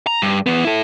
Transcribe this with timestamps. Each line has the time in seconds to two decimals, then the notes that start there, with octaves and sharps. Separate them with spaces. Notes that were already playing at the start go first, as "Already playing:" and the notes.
0.07 A#5
0.22 G2
0.46 E2 B3
0.65 E4 A4